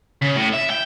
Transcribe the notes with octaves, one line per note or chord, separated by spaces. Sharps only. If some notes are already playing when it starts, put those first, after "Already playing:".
C#3
A2
E5
G5